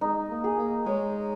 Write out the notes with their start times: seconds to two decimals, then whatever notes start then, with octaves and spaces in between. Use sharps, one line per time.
0.01 G#3 D#4
0.30 A#3
0.44 G#4
0.58 A#3
0.86 G#3 C#5